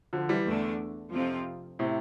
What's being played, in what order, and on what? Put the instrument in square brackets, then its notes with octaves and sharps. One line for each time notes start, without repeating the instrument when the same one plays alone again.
[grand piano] D3 F3
E3 G3
[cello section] E2 D3 A3 D4
F2 C3 F3 C4 F4
[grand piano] A2 C3